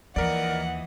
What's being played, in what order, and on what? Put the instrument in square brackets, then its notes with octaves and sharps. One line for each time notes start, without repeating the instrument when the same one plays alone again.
[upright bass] D#2 [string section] E3 F3 D#5 [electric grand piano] A#4 D5 [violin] F#5